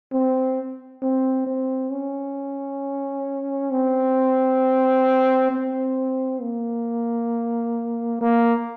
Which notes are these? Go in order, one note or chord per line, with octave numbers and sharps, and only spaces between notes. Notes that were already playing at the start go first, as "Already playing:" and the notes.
C4
C4
C4
C#4
C4
C4
A#3
A#3